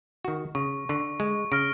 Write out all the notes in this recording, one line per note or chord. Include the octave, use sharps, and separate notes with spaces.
D#3 F#4
C#3 C#6
D3 C#6
G#3
C#3 F6 A#6 D7